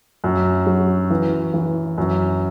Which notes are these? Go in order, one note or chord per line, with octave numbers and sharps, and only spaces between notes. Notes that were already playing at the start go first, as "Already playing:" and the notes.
F#2
F#3
E3
E3
F#2